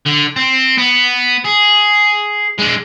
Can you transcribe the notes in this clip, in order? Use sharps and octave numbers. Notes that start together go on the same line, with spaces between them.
D3
C4
B3
G#4
G#3 D4